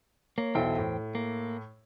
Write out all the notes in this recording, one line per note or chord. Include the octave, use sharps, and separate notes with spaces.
A#3 C#5
B1 E2 E4 A4 C5 G5
A2
A#3